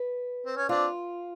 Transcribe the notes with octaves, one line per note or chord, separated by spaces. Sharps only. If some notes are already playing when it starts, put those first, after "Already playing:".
Already playing: B4
C4
C#4
C4 D4 F4